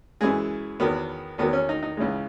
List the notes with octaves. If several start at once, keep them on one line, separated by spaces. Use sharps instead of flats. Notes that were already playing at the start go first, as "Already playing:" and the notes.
F#2 E3 G#3 G#4
E2 D#3 F#3 B3
E2 D#3 F#3 B3
C#4
D#4
D#4
C#2 C#3 E3 G#3